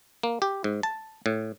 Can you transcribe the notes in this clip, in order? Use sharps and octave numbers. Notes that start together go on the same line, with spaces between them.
A#3
G4
G#2
A5
A2